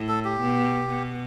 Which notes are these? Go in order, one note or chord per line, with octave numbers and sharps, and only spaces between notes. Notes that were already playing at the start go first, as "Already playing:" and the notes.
Already playing: A2
A4
G4
B2
B2